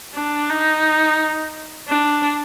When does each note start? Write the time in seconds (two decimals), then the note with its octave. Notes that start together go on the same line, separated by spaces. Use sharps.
0.15 D4
0.49 D#4
1.89 D4